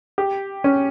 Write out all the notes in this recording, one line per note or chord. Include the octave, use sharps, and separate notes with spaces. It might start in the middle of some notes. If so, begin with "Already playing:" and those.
G4
C#4